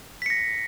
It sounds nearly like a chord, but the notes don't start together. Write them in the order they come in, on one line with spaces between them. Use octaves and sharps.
B6 C#7 A#6